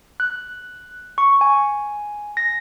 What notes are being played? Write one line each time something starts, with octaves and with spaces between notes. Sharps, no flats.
F#6
C#6
G#5
A#6